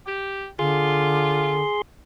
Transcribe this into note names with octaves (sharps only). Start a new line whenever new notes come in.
G4
D3 F4 G#4 C6